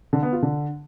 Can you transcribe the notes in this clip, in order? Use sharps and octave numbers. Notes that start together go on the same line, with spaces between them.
D3
B3
F4
D3